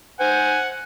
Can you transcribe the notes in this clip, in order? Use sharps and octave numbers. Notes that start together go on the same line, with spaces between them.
C5 F#5 G#5